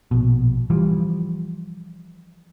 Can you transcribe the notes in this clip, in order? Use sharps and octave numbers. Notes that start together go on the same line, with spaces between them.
A#1 B2
E3 F3 G3